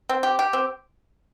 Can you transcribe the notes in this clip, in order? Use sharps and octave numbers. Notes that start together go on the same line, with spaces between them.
C4
G4
G4
C4